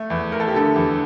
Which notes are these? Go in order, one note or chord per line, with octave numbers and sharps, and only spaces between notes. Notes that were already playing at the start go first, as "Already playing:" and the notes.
Already playing: A3
E2
A3 A#4
A4
G4
D3 A4
E2